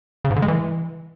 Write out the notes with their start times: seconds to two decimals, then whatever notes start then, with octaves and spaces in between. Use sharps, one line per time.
0.25 C#3
0.30 G#2
0.36 D3
0.42 G#3
0.48 E3